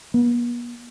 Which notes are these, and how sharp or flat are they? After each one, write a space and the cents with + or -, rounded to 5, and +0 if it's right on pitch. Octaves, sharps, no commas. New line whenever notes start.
B3 -45